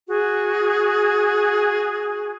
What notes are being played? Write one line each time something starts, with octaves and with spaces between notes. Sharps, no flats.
F#4 G#4